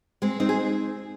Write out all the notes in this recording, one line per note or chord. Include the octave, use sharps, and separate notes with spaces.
G#3 C4
C4 D#4
G#4